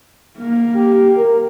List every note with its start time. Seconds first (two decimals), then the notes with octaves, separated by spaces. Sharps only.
0.37 A#3
0.75 G4
1.16 A#4